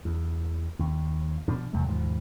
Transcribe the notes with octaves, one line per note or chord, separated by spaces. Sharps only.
E2
D#2
B2 F3 D4
E2 C3 F#3 A3
D#2 G#2 B2 F3